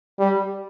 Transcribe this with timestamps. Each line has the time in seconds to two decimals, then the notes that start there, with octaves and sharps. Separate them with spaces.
0.19 G3